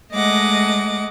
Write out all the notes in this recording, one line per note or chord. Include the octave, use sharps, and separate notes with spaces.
G#3 A3 D#5 F#5 D6